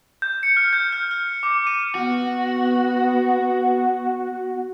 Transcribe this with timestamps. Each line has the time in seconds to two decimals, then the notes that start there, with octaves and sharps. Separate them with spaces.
0.22 G6
0.43 C#7
0.57 F6
0.73 G6
0.92 F6
1.11 F6
1.43 D6
1.67 D#7
1.95 B3 F#4